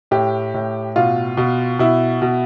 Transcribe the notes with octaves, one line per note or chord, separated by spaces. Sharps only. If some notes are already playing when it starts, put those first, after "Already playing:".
A2 G4
A2
B2 F4
B2
B2 E4
B2